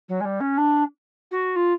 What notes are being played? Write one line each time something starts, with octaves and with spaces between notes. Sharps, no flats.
F#3
G#3
G3
C#4
D4
F#4
F4